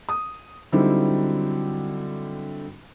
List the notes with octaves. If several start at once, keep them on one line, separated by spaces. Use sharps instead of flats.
D#6
D3 F#3 G3 C4 D#4 E4